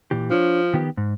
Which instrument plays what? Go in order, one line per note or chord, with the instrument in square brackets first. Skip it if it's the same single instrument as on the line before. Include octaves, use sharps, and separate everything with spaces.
[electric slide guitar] A#2 E3 G4
[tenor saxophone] F3 [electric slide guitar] D4 C#5
[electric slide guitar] D#3 B3 G4
G#2